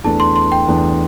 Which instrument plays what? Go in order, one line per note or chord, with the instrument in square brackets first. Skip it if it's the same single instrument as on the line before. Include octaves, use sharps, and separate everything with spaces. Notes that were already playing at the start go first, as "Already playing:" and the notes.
[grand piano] E2 E3 A3 D4 [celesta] A5
[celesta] C6
C6
G5
[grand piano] E2 E3 A3 D4